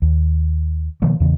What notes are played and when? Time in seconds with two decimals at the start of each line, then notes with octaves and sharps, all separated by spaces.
0.02 D#2
1.02 B2 D#3 F3 A#3
1.20 E2 C#3 E3